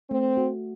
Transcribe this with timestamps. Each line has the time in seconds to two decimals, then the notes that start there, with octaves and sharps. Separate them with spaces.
0.10 A3 C4
0.37 F#4